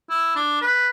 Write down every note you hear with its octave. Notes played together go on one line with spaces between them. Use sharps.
E4
D4
B4